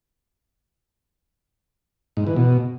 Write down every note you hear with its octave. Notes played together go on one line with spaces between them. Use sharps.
G#2
E3
B2